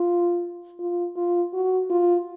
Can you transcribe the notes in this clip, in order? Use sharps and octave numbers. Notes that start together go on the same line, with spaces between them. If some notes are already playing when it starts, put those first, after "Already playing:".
Already playing: F4
F4
F4
F#4
F4